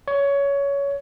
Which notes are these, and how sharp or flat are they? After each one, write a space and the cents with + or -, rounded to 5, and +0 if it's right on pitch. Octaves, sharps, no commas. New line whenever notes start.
C#5 +20